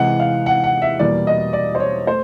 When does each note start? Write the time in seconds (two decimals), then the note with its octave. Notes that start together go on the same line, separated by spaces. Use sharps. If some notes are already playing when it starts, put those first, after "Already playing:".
Already playing: C3 E3 G#3 F#5
0.20 F5
0.46 F#5
0.64 F#5
0.82 E5
0.99 E2 B2 G3 A#3 D5
1.27 D#5
1.53 D5
1.75 C5
1.80 C#5
2.07 A3 C5